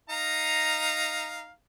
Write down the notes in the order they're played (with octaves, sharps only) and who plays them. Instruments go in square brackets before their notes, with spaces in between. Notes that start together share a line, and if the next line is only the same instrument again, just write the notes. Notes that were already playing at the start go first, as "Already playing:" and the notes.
[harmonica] D#4 F5 A#5